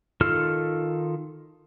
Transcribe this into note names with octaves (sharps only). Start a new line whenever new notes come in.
D#3 F4 A4 F6